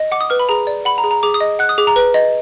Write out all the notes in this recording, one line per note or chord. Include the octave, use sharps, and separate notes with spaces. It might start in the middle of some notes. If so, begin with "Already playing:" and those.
Already playing: D#5
F#5 D6
D#6
B4 F6
B5
G#4 A#5
D5
F#5 B5
A#5
G#4
A#5
G#4 D6
D#6
D#5
F#5 F#6
D#6
G#4 D6
A#5
B4
D#5